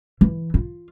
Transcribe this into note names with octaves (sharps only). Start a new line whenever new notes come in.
E3
F4